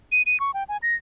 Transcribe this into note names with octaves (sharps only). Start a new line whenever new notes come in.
D#7
D#7
C#6
G5
G#5
A#6